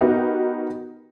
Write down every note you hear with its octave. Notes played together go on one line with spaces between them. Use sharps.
B3 D#4 F#4 G4 A#4 B4